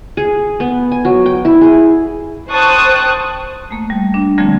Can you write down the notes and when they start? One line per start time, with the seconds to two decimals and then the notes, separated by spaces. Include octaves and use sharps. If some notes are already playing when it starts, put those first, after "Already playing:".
0.17 G#4
0.60 B3
0.91 G#5
1.05 F#3
1.26 G5
1.45 E4
1.61 G#4
2.50 C5 G5 A5 C#6 D#6 F#6
3.71 A3 A#3
3.90 G3
4.14 D4
4.38 D3 F3 G3 A3 A#3 C4